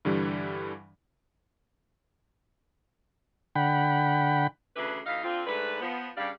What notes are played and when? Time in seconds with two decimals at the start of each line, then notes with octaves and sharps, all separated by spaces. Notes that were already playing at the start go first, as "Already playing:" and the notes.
0.05 G2 D3 E3 G3
3.56 D3 F#5 G5 B5
4.75 D2 C#3 E3 D4 B4
5.06 D2 E3 D#4 F5
5.23 D3 C4 F4
5.47 G#2 A3 D4 B4
5.81 F3 B3
6.17 G2 C#3 G3 G4 D5 F5